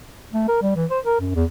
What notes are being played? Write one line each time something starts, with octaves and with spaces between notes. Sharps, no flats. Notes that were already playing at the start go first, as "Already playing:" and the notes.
A3
A#4
G3
E3
C5
A#4
F#2
E2